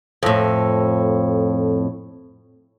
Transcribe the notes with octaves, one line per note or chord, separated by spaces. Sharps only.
F2 A2